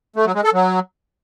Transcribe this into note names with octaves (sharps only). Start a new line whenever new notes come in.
A3
F#3
G#3
A4
F#3